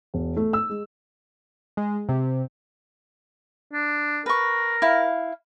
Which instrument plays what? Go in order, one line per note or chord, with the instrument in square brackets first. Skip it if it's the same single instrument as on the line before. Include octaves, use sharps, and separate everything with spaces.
[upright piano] E1
A3
E6
G#3
[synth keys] G#3
C3
[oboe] D4
[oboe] A#4 [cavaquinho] B4 C#6
[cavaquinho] E4 F5